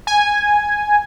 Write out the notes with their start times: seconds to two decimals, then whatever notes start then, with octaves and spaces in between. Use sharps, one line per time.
0.07 G#5